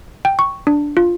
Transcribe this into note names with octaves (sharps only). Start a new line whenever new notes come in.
G5
C#6
D4
F4